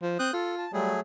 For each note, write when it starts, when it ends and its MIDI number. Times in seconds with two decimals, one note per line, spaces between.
0.02 0.18 53
0.19 0.29 60
0.19 0.33 87
0.19 0.33 90
0.19 0.33 91
0.33 0.66 65
0.33 0.55 69
0.58 0.71 81
0.73 1.00 54
0.73 0.91 55
0.73 1.00 57
0.73 1.00 68